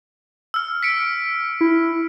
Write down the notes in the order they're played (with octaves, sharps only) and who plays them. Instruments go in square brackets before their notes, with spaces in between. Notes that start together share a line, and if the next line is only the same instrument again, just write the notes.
[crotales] E6 F6
B6 C#7 D7
[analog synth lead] E4